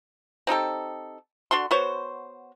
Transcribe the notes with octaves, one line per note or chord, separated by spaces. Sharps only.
C4 D#4 G4 A4
D3 D4 F#4 C6
B3 F#4 C5 C#5